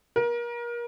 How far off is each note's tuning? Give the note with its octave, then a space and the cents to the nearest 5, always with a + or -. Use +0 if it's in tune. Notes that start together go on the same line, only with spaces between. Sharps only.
A#4 +30